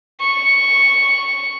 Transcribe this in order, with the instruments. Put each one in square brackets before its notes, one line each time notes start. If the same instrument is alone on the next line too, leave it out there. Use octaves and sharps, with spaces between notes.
[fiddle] C#6